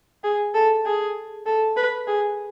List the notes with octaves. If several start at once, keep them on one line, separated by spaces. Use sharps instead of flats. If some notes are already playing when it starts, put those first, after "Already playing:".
G#4
A4
G#4
A4
B4
G#4